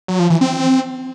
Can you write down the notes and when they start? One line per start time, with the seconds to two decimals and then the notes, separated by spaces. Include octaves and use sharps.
0.08 F#3
0.19 F3
0.30 E3
0.41 C4